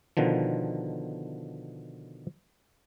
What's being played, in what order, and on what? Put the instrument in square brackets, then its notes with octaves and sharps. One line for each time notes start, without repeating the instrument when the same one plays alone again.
[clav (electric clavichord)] B2 D3 D#3 F3